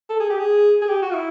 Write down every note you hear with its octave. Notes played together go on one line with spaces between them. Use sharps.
A4
G#4
G4
G#4
G#4
G4
F#4
F4
E4